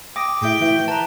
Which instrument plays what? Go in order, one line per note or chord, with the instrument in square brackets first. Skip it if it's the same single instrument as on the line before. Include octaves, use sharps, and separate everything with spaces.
[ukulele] G5 [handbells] D6 D#6 A#6
[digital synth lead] A2 [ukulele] G#4 E5 [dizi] G5
[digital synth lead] E3 [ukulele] F#4 E5
[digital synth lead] B4 [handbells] A5 A#5